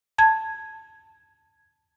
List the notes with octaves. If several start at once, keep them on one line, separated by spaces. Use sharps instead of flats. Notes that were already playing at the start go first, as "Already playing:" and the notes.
A5 G#6